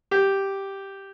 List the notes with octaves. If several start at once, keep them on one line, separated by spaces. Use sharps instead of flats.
G4